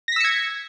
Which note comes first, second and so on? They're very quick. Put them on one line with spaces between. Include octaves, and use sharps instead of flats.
A#6 B6 E6 C#7 G#6